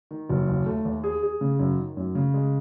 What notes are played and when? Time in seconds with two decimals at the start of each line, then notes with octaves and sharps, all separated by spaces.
0.11 D#3
0.29 F#1
0.48 D#2
0.66 A3
0.85 D#2
1.04 G#4
1.23 G#4
1.41 C#3
1.59 F#2
1.78 D#3
1.97 F#2
2.15 C#3
2.34 G#3